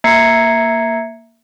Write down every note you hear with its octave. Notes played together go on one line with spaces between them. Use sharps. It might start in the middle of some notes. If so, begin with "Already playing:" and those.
A#3 E5 A#5 G#6 C7 C#7